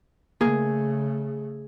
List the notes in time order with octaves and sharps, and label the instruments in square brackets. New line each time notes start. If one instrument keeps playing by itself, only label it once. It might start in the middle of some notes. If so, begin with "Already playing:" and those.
[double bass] C#3 A3 [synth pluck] A#3 [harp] G#4